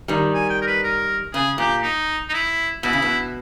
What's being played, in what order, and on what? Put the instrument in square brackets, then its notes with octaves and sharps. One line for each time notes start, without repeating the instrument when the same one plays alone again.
[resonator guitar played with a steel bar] D#3 G3
[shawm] G#5
G5
A#4
B4
A#4
[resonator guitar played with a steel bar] C#3 [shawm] G#4
[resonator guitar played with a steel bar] A#2 [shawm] G4
[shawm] D#4
D#4
E4
[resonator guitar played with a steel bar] B2 [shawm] E4
[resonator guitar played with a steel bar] C#3
B2